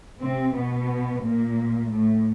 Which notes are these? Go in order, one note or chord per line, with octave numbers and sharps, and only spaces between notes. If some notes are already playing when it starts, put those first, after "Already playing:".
C3 C4
B2 B3
A#2 A#3
A2 A3